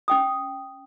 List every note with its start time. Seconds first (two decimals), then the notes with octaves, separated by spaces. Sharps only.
0.08 C#4 G5 D#6